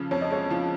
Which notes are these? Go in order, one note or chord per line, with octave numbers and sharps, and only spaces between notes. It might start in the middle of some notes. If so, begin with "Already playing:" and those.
Already playing: F2 C#3 F3
F2 C#5
D#5
G#3 C#5
F3